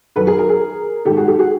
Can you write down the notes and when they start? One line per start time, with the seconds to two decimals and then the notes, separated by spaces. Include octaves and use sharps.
0.16 F#2 D#3 A4 B4
0.27 G#4 A#4
0.38 G#4 A#4
0.49 G#4 A#4
1.05 G#2 D#3 G4 A4
1.17 F#4 G#4
1.27 G4 A4
1.39 F#4 G#4